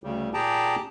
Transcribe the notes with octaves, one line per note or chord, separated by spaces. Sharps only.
D2 C#3 G3
A#2 G4 G#4 G5 A5 A#5